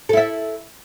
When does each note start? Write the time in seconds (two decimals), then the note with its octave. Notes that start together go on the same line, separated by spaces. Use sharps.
0.09 A4
0.13 E4
0.17 E5